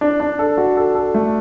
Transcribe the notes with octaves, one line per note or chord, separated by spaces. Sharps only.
D4
D4
A4
F#4
A4
A4
A3